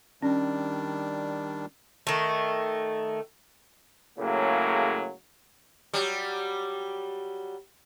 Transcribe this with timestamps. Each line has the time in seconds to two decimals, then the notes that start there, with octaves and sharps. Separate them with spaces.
0.22 D#3 G3 C#4 D4
2.07 D#3 A3
4.18 A2 C#3 F#3 G#3 A#3
5.93 F#3 G3